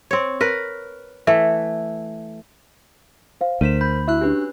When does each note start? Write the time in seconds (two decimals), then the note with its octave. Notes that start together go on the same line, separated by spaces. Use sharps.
0.11 C4 C#5
0.41 A#4 B4
1.27 E3 A3
3.41 C5 F5
3.61 D2 A#4 C5 B6 D#7 E7
3.81 B5 G6
4.08 E4 F#4 E5 E6 F#6
4.21 C#4 D4 G4 B4